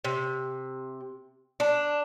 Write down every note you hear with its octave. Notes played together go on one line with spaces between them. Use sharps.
C3
D4